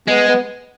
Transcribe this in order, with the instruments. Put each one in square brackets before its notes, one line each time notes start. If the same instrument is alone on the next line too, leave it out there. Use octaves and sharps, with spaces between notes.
[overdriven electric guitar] G#3 [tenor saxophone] B3
[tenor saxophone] B3